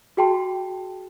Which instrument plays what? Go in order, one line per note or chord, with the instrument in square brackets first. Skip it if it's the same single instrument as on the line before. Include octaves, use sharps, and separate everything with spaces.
[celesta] F#4 G#4 G5 A5 C6